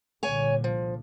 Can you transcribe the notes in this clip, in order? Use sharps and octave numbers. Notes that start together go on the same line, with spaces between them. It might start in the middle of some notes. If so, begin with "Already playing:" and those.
C2 A#2 D3 C#5 G#5
F3